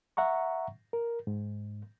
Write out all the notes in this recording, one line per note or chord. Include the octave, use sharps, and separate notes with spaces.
E5 F#5 A#5 C#6
A#4
G#2